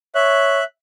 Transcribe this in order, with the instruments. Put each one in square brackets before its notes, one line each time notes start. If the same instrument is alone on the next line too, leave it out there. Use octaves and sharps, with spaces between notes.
[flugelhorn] C#5 [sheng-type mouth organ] E5 F#6